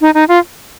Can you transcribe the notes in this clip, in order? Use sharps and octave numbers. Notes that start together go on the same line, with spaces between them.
D#4
D#4
F4